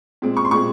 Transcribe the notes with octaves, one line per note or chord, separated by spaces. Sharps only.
A#2 G#3 C4
C#6
C6
A#2 G#3 C4 C#6